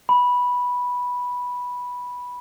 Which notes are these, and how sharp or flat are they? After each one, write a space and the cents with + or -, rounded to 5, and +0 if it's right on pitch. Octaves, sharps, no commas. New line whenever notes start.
B5 -10